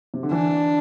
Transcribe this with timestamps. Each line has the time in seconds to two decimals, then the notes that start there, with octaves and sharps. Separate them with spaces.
0.14 C3
0.23 D3
0.31 E3 D4